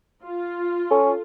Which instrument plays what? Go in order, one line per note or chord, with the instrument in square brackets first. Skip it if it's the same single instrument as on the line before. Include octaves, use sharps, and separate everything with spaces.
[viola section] F4
[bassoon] C#4 [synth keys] A4